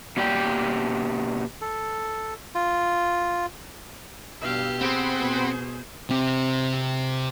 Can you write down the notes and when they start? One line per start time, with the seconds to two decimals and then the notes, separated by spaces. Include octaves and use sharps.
0.16 B2 A#3 G4 D5 G5
1.61 A4
2.55 F4
4.41 G2 B2 G4 F5 E6
4.81 C4 G#4 C5 F#5 B5 C6
5.18 B2
6.10 C3 C4